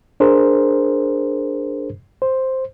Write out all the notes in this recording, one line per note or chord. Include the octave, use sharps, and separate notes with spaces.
D4 G#4 A#4 C5
C5